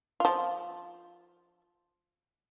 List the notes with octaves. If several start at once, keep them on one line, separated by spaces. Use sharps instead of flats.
F3 F4